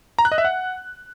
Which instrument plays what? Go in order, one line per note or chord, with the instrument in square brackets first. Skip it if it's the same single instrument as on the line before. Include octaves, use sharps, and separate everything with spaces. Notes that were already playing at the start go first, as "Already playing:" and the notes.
[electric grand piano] A#5
F#6
D#5
E5
F#5